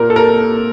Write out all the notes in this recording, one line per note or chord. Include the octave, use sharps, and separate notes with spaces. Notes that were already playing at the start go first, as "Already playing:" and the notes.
Already playing: A#2 A#3 A#4
A4
A#4